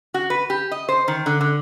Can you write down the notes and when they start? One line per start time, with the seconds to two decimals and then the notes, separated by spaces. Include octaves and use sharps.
0.14 F#4
0.30 B4
0.50 G4
0.71 D#5
0.89 C5
1.08 D#3
1.26 D3
1.41 D3